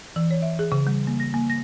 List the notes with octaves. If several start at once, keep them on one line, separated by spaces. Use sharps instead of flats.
E3
C#5
E5
G#4
C#3
G3
A#3
A#6
A#3
A#6